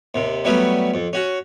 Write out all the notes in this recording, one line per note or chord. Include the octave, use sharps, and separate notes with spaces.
D#2 C3
F#3 G3 A3 B3 C#4
F2
C#4 F#4